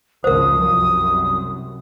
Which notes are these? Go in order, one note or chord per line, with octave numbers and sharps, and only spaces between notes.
G#1 C#2 F3 A#4 C5 D#6
C2 F#2